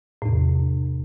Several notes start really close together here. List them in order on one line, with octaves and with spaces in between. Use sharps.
A2 E2 C3